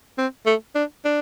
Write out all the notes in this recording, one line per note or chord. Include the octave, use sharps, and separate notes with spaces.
C4
A3
D4
D4